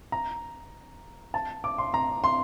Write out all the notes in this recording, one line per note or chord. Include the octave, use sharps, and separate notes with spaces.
A#5
A5
D6
C6
A#5
C6